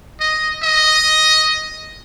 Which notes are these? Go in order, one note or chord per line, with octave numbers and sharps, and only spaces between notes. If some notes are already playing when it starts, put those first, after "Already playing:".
D#5
D#5